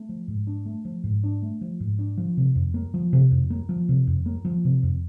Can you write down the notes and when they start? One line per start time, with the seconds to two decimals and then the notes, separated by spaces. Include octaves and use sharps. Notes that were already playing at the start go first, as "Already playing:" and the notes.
Already playing: A3
0.09 F3
0.28 G#2
0.47 D4
0.66 A3
0.85 F3
1.04 G#2
1.24 D4
1.42 A3
1.61 F3
1.80 G#2
1.99 D4
2.18 F3
2.37 C3
2.55 F2
2.74 A#3
2.94 F3
3.13 C3
3.31 F2
3.50 A#3
3.69 F3
3.89 C3
4.07 F2
4.26 A#3
4.45 F3
4.65 C3
4.83 F2